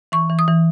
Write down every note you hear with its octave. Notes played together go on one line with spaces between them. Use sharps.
E3 C#6
E3
D#6
E3